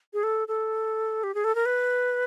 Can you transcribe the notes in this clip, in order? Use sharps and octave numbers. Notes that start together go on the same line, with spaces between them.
G#4
A4
A4
G4
G#4
A4
A#4
B4